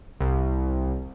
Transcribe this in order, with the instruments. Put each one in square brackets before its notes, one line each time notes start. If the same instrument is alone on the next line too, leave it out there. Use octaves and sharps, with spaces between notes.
[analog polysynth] C2